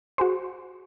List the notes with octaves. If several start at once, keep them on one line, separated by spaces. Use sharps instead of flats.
F#4 G#4 C5